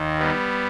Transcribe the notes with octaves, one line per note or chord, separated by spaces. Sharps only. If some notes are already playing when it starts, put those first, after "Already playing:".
Already playing: D#2 D#3
G3 B3